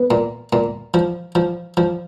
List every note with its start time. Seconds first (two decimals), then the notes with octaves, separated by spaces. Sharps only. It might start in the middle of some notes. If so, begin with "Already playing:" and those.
Already playing: B3
0.11 A#2
0.53 A#2
0.94 F3
1.35 F3
1.77 F3